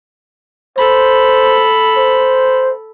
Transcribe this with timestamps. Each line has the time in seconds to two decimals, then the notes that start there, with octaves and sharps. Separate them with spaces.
0.77 A4 C5 B5
1.97 C5